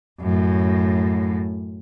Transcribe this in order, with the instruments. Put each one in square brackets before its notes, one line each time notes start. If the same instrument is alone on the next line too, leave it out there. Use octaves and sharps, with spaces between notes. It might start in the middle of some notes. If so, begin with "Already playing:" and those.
[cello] F#2 A2